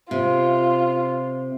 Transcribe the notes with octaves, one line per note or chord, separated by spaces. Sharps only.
C3 F4